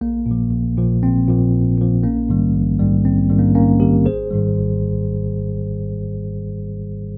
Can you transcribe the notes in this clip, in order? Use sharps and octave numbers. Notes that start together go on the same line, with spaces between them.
A#1 A#3
A#2
F3
A#1
A#2 F3
A#1 C4
A#2 F3
A#1
A#2 F3
A#1 A#3 C#4
G#2 D#3 G3
A#1
G#2 D#3 G3
A#1 C4
G#2 D#3 G3
A#3 C#4
A#1 A#3 C#4
G#2 D#3 G3 G4 A#4
G#1 G#4 C5
G#2 D#3 G3
G#1